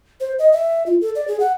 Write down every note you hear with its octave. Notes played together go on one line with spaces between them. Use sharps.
C5
D#5
E5
F4
A4
D5
G#4
F#5